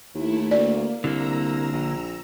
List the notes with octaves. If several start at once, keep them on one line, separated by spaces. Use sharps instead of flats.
D#2 A3 E4
D2 A#3 D5
C2 D3 A#3 A#5 E6
A#1